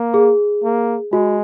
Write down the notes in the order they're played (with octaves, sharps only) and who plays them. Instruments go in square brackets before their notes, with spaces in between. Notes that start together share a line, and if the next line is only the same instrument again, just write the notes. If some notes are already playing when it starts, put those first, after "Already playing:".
Already playing: [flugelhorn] A#3
[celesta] G#4
[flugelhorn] A#3
[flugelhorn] G#3 [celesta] F#4